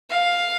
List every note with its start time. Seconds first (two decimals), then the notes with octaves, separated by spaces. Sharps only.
0.10 F5